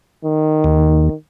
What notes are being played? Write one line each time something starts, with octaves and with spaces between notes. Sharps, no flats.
D#3
D#2